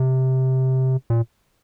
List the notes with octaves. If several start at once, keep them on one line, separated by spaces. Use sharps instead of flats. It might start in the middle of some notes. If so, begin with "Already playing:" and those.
Already playing: C3
A#2